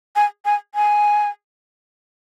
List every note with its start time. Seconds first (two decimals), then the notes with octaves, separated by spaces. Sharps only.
0.16 G#5
0.45 G#5
0.75 G#5